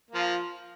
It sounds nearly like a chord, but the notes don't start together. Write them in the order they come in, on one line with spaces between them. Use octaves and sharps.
A#3 F3 F4